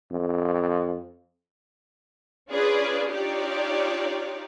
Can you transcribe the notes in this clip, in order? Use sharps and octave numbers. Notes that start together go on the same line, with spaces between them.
F2
C#4 D4 F4 G#4 B4 D5
D4 D#4 F4 G4 C#5 D5